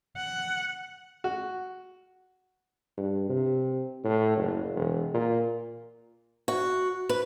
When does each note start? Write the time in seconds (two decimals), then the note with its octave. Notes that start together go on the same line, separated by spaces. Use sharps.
0.17 F#5
1.24 F#4
2.97 G2
3.29 C3
4.04 A2
4.37 F#1
4.75 E1
5.14 A#2
6.48 F#4
7.09 B4